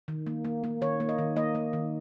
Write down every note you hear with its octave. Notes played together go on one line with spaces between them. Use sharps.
D#3
A#3
A#3
A#3
D#3 C#5
A#3
D#5
D#3
A#3 D#5
A#3
D#3